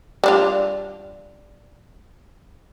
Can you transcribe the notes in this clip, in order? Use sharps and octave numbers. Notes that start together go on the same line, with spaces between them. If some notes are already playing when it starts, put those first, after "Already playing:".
G3 D4 F4